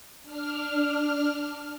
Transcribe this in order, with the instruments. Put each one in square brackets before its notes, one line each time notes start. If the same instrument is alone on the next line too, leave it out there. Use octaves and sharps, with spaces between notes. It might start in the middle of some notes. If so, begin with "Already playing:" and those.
[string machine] D4 F6